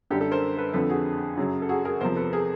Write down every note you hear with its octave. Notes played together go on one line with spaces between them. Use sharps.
F#2 D3 G3 G4 A4
G4 A4
A#4 C5
A4 B4
F2 D3 F3 A4 B4
F#4 G#4
F#2 C#3 F#3
A4
F#4 G#4
G#4 A#4
E2 C3 F3 A#4 C5
A4 B4
G#4 A#4